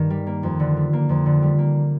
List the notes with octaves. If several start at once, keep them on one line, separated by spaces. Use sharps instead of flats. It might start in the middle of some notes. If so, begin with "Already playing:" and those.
Already playing: G2 D#3 A#3
G3
A#3
F2
D3
G3
A#3
F2
D3
G3
A#3